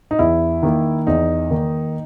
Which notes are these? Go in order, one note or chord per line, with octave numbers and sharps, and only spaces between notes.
D#4
E2 E4
D#3 A#3
E2 D#4
D#3 A#3